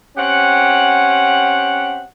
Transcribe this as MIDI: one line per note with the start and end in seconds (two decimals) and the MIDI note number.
0.17 2.05 60
0.17 2.05 61
0.17 2.05 67
0.17 2.05 78